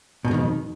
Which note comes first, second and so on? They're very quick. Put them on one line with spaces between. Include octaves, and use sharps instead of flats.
B2 G#2 D#3 F2